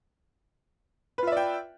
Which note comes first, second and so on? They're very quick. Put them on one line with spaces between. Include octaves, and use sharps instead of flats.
B4 F4 E5 D5 G5